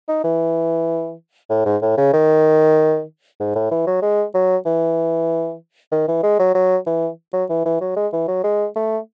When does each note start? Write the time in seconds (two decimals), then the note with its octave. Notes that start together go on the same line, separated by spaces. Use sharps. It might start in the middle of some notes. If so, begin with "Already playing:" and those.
0.08 D#4
0.24 E3
1.50 A2
1.66 G#2
1.82 A2
1.97 C#3
2.13 D#3
3.40 G#2
3.55 A2
3.71 E3
3.87 F#3
4.02 G#3
4.35 F#3
4.66 E3
5.92 D#3
6.08 E3
6.23 G#3
6.39 F#3
6.54 F#3
6.86 E3
7.33 F#3
7.49 E3
7.65 E3
7.81 F#3
7.96 G#3
8.13 E3
8.28 F#3
8.44 G#3
8.76 A3